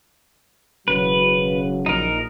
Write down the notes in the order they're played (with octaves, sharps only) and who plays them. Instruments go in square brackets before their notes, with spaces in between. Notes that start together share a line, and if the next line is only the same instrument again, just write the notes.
[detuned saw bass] E1 [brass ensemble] C#3 F#3 [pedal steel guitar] B4
[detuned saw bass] A#1 [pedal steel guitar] D#4 A#4